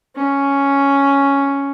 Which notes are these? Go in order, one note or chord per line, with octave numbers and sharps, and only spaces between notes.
C#4